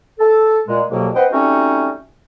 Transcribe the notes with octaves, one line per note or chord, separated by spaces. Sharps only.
A4
A#2 G#3
C2 F2 B2 F#3 A#3
C4 B4 C5 D#5 F#5 G5
G3 A3 C4 C#4 D#4 F#4